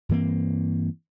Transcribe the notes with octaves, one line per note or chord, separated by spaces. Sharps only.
G2 E3 A#3 C4